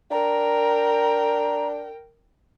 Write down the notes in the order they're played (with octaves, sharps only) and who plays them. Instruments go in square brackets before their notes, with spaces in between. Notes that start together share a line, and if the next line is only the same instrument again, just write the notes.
[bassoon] D4 [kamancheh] A#4 G5 [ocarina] A#5